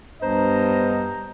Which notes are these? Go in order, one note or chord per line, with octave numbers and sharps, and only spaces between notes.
G2 B3 D4 C5 D#5 A#5